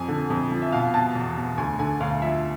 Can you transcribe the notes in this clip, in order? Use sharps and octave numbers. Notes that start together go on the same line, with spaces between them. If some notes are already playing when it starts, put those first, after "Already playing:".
Already playing: F2 G#5
D3
F2
F3
E5
B2 F5
B2 A5
E2
E2
D2 G#5
D3 G#5
D2 F5
F3 E5